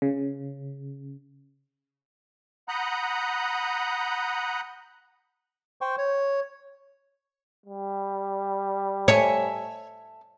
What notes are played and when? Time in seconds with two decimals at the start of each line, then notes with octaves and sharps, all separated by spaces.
0.02 C#3
2.68 F#5 A#5 B5 D#6 F#6 G6
5.81 C5 G5 C#6
5.98 C#5
7.66 G3
9.08 A4 C#5 E5 G#5